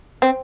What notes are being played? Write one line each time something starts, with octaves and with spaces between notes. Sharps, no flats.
C4